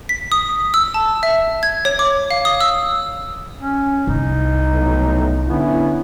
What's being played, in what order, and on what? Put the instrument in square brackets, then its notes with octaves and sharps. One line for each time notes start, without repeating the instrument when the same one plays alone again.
[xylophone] B6
D#6
E6
A5
E5
G#6
C#5
D6
F5
D#6
E6
[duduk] C#4
[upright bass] C2 [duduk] D#4
[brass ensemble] B1 A2
[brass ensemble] D3 C#4 E4 [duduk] B3